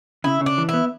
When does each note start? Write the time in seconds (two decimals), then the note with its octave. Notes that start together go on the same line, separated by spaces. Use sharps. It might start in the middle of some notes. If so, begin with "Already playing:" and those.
0.24 C#3 E4
0.41 C#3
0.46 D4
0.58 E3
0.69 B3 E4